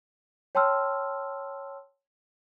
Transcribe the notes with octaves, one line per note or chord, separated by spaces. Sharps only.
C#5 G5 A5 C6 E6 F6